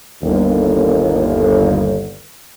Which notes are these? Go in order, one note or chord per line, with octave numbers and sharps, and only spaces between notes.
G1 D#2